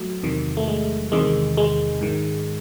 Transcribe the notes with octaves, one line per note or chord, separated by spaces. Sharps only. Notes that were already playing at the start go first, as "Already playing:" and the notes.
Already playing: F#3 A3
E2 C3 D#3
A3
G#3
E2 C3 D#3 G#3
G#3
G#2 D#3